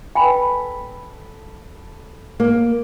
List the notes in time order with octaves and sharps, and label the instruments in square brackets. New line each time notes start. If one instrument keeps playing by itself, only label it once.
[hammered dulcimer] A4 B4 [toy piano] G5 G#5 B5
[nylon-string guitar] A#3